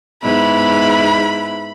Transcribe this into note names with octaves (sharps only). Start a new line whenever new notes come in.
G#2 B3 E4 B5